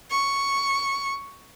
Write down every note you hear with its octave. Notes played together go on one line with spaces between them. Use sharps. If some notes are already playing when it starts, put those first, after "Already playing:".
C#6